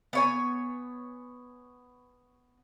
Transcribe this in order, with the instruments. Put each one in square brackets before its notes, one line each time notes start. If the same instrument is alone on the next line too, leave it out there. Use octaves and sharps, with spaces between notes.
[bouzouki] B3 C#5 G#5